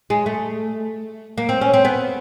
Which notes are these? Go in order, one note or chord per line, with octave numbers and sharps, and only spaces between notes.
G#3
A3
A#3
C4
C#4
C4
B3